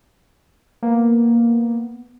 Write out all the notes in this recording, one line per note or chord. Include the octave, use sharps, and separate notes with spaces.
A#3 B3